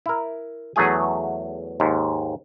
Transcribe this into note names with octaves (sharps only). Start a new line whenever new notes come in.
E4 A#4
E2 F#3 A3 G#4 G#5
D#2 G#2